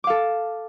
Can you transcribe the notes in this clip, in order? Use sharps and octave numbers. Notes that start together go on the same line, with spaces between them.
A4 F5 D6